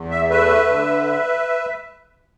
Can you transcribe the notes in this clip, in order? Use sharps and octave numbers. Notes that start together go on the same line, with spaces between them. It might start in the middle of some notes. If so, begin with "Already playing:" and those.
Already playing: E2
E5
A3 B4 E5
D3